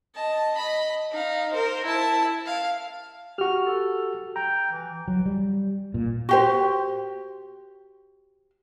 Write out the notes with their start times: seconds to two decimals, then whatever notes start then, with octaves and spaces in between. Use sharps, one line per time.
0.15 D#5 A5
0.55 D#5 B5
1.11 D#4 F5
1.52 A#4 C5
1.85 E4 A5
2.46 F5
3.38 F#4 G4 F6
3.66 A4
4.36 G5 A#5
4.72 E3
5.08 F#3
5.26 G3
5.94 A#2
6.29 F#4 G4 C5